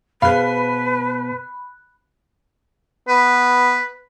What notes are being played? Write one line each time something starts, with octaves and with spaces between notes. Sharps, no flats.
B2 G#4 B4 C5 F5 B5 F#6
B3 B4